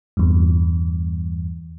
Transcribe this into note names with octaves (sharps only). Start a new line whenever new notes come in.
E2 G2